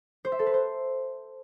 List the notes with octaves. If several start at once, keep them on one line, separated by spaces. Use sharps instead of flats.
C5
E5
A4
B4
C5